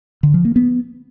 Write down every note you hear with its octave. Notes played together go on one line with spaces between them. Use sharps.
D3
F3
A#3
B3